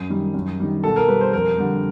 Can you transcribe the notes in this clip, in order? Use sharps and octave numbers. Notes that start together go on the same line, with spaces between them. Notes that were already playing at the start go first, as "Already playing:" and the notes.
Already playing: F#2
D#3 G3
F#2
D#3 G3
B2 A4
A#4
G3 B4
C5
F2 A#4
D3 G3